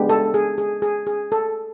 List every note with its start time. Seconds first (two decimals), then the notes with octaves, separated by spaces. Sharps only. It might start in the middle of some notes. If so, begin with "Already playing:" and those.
Already playing: G#3 B3 D4 G4
0.09 A4
0.34 G#4
0.58 G#4
0.82 G#4
1.07 G#4
1.32 A4